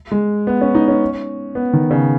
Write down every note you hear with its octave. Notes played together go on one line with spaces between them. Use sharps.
G#3
B3
C#4
D#4
C#4
B3
D#3
C#3